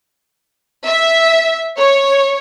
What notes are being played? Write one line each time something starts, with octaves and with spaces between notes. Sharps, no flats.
E5
C#5